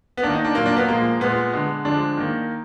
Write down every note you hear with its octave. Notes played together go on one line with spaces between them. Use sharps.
B3
D#3 A#3 D4
D#4
D4
A#2 F#3 A#3
D4
B3
A#2 F3 G#3 A#3
A#2 G#3 B3
D3 G#3
D3 F3 G#3 D4
D#3 A#3